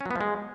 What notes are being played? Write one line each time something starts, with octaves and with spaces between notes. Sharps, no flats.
C#4
F#3
B3
F3
G#3